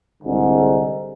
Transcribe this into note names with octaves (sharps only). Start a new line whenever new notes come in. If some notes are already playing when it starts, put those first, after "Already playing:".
C2 G#2 D3